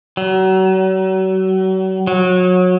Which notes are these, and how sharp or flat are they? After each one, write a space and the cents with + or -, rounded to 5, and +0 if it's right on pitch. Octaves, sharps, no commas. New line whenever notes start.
F#3 +35
F#3 -25